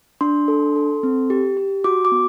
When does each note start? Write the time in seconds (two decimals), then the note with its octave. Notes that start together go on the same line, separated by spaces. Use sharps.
0.21 D4 C6
0.48 A4
0.76 A4
1.03 C4
1.30 G4
1.57 G4
1.84 F#4 D6
2.05 D6
2.12 B3